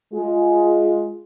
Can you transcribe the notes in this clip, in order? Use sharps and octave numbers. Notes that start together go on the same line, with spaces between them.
G#3 F4 G#4